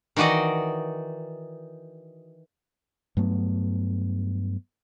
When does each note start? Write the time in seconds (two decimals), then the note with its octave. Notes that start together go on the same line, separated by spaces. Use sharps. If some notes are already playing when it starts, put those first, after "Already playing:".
0.16 D#3 E3 F#4 D5 D#5
3.17 G2 F#3 A3 B3